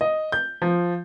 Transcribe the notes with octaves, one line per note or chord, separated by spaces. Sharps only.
D#5
G6
F3